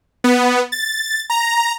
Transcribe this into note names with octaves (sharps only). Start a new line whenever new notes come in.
B3
A6
A#5